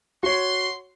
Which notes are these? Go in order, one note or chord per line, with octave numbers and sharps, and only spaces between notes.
F#4 C#5 C6